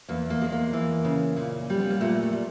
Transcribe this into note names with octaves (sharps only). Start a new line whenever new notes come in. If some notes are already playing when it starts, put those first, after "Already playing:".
E2 A#3
A#3
G#3
A#3
E3
C#3
A#2
G3
B3
A#3
A#2 A3
A3
G3